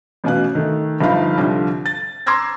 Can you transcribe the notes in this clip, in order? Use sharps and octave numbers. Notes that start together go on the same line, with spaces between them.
A1 B2 C#4 F5 F#6
D#3 A3
G1 F3 D#4 F5 B5
C2 D3 F3
A6
A#5 C6 D6 E6 G#6 A#6